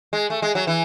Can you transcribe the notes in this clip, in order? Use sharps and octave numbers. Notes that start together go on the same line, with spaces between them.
G#3
A3
G#3
F#3
E3